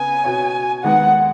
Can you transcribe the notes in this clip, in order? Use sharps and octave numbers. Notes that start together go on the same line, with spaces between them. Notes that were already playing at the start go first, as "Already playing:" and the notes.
Already playing: C#3 B3 G#5
B2 B3 F#4 C#5
D#2 D#3 G#3 B3 F#5